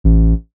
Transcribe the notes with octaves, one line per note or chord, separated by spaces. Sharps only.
A1